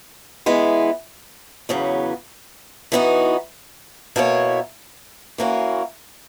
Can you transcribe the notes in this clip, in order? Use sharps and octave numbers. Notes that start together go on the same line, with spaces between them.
E3 G#3 B3
E2 C#3 F#3 B3
E3 B3 D#4 F#4
B2 A#3 E4 A#4 C#5
E3 A#3 C#4 F#4